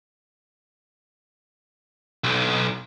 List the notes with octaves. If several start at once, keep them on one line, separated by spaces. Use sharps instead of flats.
B1